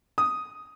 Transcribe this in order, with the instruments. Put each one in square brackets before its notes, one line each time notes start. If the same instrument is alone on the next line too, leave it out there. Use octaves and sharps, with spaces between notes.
[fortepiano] D#6